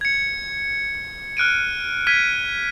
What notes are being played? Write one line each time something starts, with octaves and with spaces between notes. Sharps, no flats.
G#6 C#7
F6 F#6 D7 D#7
F6 G#6 B6 D#7